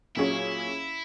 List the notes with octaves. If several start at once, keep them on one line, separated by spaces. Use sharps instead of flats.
A#2 F#3 C#4 E4 G#4 C#5